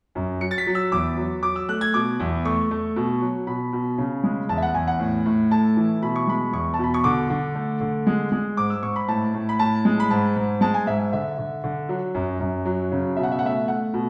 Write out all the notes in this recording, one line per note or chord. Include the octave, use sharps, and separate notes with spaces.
F#2
F#3 C#7
A6
B6
F#3
E6
E2 D6
F#3
F#3 D6
E6
A3 F#6
G#6
B2 D6
E2
A3 C#6
A3
B2
F#3
B2 B5
B2
C#3
G#3
E2 A5
E5
F#5
E2 G#5
F#5
A2
A2
A3 A5
E3
B2 B5
C#6
G#3 B5
E2 C#6
A5
B2 B5
C#6
D3 D6
D3
A3
D3
G#3
G#3
G#2 D6
E6
G#2 C#6
B5
A2 A5
A2
B5
A2 A5
G#3
B5
G#2 A5
G#2
G#3 A5
G#5
G#2 E5
E5
D3 E5
D3
D3
F#3
F#2
F#2
F#3
C#3
B2 E5
F#5
E5
F#5
A3 E5
A3 F#5
B2